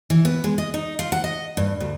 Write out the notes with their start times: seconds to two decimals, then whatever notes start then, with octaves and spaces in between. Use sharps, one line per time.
0.10 E3
0.25 B3
0.44 G#3
0.58 D#5
0.74 D#4
0.99 F4
1.12 F#5
1.24 D#5
1.57 G2
1.80 D2